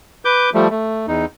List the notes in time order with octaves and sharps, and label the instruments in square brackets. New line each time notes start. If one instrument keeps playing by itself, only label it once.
[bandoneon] B4 D6 G6
F3 G3 A3
A3
E2 D#4